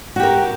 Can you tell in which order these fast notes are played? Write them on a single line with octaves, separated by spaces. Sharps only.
F#4 G4 A#4